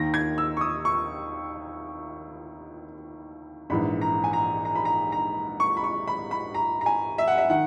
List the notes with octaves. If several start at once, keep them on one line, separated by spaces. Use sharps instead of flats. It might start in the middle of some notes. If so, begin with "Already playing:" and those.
Already playing: D#2 D#3 A#6
G#6
E6
C#6
D#6
C#6
A#1 G#2 E3 B5
A#5
G#5
A#5
A#5
B5
A#5
A#5
C#6
B5
C#6
B5
B5
A#5
A#5
G#5
E5
F#5
E5
D#3 F#5